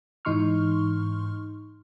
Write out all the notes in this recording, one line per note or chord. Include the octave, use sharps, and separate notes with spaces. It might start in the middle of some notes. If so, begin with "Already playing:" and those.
G#2 E3 D#4 C6 C#6 F6